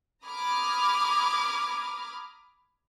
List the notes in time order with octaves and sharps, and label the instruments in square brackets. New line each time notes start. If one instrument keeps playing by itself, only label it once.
[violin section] A#5 B5 D6 D#6 F6 G#6